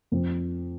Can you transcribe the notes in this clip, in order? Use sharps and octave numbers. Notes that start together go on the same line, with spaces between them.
F2